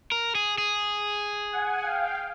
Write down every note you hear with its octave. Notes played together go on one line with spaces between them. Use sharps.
A#4
G#4
G#4
F#5 G#5
F5 G5